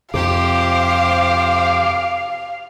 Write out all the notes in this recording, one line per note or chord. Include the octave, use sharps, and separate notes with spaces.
F2 C3 G4 C5 F5 D6